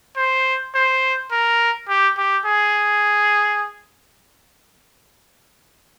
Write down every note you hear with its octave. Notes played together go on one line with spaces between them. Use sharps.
C5
C5
A#4
G4
G4
G#4